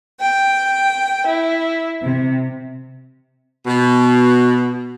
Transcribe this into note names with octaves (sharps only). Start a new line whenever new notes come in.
G5
E4
C3
B2